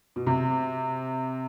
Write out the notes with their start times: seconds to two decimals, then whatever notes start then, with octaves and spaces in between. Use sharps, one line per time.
0.16 B2
0.27 C3